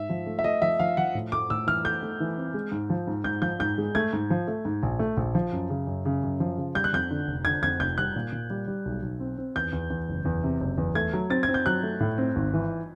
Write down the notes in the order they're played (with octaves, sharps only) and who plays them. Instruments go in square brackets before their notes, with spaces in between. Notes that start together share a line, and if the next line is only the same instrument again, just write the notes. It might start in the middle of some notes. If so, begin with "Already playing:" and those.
Already playing: [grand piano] G#2 [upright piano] E5
[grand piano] F3
A3
[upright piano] E5
[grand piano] A3 [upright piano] D#5
[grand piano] F3 [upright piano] E5
[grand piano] F3 [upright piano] F5
[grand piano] F3 [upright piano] F#5
[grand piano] A2
[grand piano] A3 [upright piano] D6
[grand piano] A2 [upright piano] E6
[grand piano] E3 [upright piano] F6
[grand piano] A3 [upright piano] G6
[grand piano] A3
E3
C4
G#3
G#2
F3
G#2
[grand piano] G#2 [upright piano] G6
[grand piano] F3 [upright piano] G6
[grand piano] G#2 [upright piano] G6
[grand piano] G#3
[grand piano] A3 [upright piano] G#6
[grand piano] G#2
F3
A3
G#2
A#1
A3
A#1
F3
F#2
C#3
F#2
C#3
F#2
F3
C#3
[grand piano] G3 [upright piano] G6
[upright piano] F#6
[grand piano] F2 [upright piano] G6
[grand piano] D3
F1
[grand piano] D3 [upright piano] G#6
[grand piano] F2 [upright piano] G#6
[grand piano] F1 [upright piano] G6
[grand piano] G3 [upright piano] F#6
[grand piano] A#2
A#2
G3
G3
B1
B1
C4
C4
[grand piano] E2 [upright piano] G6
[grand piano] E2
E2
F#1
E2
C3
F#1
E2
[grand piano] A3 [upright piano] G#6
[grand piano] F#3
[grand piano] C4 [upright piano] A6
[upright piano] G#6
[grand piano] C4
[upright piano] G6
[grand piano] F#3 [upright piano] F#6
[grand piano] A3
A2
C4
G#1
E3